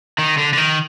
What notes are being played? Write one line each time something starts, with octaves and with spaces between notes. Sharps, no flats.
D#3
D3
D3
D#3